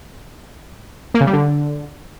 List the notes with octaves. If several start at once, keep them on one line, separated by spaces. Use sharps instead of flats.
A#3
C#3
G3
D3